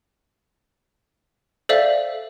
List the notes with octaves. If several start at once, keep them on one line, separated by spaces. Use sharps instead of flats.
A4 C5 D5 E5 F5